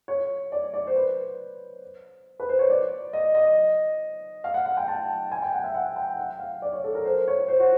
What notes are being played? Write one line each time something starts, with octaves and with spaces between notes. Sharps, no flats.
C#5
D5
D5
C5
B4
B4
C5
C#5
D5
D#5
D#5
F5
F#5
F#5
G5
A5
G#5
G5
F#5
E5
F#5
G5
F#5
F5
D5
C#5
A4
A#4
C5
C#5
C5
F#4